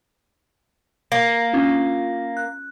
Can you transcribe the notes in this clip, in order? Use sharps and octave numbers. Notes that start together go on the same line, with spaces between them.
A#3
C#4 D4 F4
F#6